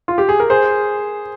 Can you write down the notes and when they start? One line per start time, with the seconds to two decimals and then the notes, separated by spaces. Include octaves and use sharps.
0.08 F4
0.18 G4
0.29 G#4
0.40 A#4
0.50 G#4 C5